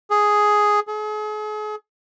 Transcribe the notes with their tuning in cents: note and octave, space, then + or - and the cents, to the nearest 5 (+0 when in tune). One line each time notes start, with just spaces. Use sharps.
G#4 +5
G#4 +40